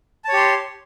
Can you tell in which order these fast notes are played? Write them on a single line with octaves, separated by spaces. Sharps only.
A5 C#5 G4 C6